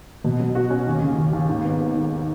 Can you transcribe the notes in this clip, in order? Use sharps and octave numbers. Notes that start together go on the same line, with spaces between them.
B2
F#3
F#4
C#4
D#2
C#3
D#2
D#2
G#2
B3
B3
D#3